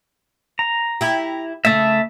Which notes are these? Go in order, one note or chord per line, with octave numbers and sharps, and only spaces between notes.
A#5
E4 G4
C#3 A3 E5 A5